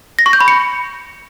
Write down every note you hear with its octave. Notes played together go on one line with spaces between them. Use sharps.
A#6
C#6
G6
B5
C#7